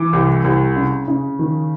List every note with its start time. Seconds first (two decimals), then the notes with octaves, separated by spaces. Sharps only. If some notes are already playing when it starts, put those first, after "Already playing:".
Already playing: E3 D6
0.13 C2
0.44 C2
0.76 C#3
1.08 C#3
1.39 D#3